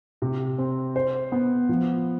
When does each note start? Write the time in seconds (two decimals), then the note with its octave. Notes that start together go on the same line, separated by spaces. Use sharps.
0.22 C3
0.58 C4
0.96 C5
1.32 B3
1.69 F3